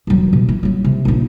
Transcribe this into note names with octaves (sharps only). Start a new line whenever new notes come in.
E1 F#3
B2
E4
F#3 E4
C3
A#1 D#4